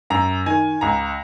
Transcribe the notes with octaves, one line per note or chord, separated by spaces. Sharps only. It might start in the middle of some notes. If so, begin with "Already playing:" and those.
F#2 A#5
D#3 G#5
C#2 A#5